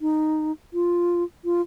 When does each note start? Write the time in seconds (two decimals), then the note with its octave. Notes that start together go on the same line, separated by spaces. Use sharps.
0.01 D#4
0.73 F4
1.45 F4